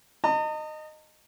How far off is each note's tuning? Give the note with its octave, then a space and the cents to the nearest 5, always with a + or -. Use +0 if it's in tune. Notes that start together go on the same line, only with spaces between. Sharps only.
D#5 -15 A#5 -45